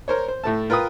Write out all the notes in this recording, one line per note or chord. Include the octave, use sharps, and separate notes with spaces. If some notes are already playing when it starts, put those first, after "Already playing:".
A#4 C5 C#5
C5
A2 A3 A5
F4 A#4 B4 G5 D#6